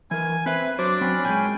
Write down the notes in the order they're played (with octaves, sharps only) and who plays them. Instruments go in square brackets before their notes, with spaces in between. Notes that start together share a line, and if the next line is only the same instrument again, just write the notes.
[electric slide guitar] E3 A#4 [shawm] G#5
[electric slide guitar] C4 C5 E5 [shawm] B4
[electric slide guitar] F#3 [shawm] D4 [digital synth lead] C5 [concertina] D6
[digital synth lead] F#3 [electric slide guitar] C4 [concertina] C#4 B5
[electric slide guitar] A#2 G#3 [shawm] G5 [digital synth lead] G#5